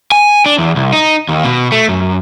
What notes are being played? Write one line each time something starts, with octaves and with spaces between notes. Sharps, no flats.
G#5
D4
E2
C2
D#4
D#2
B2
A3
F#2